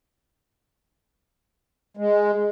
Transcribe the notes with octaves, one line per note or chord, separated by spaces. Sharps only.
G#3